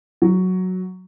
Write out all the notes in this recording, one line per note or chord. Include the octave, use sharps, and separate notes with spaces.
F#3